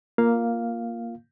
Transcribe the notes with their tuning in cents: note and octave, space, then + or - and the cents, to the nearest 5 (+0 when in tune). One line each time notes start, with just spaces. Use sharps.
A#3 +0 F4 +0 F5 +0